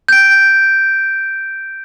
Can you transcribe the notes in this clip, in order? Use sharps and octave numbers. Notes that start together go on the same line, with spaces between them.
G6 D7